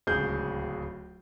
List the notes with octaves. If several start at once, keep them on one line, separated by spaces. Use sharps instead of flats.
D1 C#2 G#4 G6